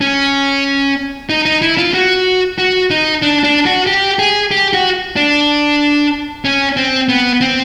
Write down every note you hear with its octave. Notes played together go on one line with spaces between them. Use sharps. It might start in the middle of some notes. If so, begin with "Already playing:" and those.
C#4
D#4
D#4
E4
F4
F#4
F#4
D#4
D4
D4
F#4
G4
G#4
G4
F#4
D4
C#4
C4
B3
C4